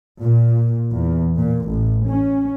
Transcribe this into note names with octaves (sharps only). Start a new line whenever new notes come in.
A#2
E2
A#2
A1
C#4